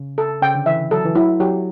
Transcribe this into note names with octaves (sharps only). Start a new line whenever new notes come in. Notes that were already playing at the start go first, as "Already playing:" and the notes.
Already playing: C#3
A4
C#3 G5
D3
E3 E5
F#3 A4
E3
F#3 E4
F#3 G4